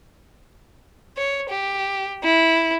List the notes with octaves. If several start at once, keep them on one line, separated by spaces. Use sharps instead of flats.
C#5
G4
E4